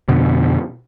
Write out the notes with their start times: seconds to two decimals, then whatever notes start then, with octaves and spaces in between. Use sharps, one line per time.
0.08 F2 B2 D3